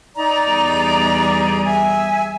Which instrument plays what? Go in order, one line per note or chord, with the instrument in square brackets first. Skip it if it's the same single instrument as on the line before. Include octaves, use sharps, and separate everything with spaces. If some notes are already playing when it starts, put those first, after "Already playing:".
[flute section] D#4 D5 A#5
[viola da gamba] E2 G3 G#4
[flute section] E5 G#5